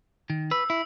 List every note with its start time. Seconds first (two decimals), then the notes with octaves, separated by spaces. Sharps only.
0.30 D#3
0.51 B4 E6
0.70 E4